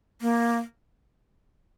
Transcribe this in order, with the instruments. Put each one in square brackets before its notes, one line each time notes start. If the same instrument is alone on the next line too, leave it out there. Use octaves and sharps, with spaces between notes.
[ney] A#3